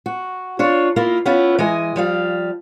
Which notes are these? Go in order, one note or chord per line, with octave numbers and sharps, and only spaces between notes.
F#4
D4 F4 C#5
A#3 E4 F4 A#4
B3 C#4 E4 F4
E3 G#3 D#5 G#5
F3 G3 F5